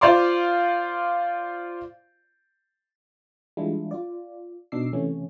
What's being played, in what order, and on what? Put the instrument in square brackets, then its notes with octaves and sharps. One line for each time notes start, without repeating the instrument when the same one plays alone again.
[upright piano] F4 C5 D5 F5 C6 D6
[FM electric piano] E3 G3 G#3 D4 E4 F4
F4 D5
B2 D4 D#4 D6 E6 C7
C3 E3 A3 C#4